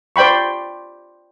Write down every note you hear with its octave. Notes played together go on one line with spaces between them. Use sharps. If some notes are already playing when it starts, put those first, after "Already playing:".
C5 D5 G5 B5 C#6